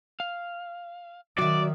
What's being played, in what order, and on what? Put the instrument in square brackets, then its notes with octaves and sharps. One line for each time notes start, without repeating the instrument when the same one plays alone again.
[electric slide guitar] F5
[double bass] D#3 [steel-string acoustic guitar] F#3 E5 [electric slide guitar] F#4 [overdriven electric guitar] D5